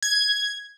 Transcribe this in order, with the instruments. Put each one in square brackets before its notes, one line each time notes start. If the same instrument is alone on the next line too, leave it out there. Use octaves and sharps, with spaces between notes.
[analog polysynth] G#6